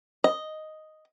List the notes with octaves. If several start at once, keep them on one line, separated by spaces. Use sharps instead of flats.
D#5